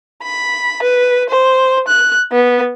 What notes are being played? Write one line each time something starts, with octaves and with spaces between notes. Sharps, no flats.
B5
B4
C5
F#6
B3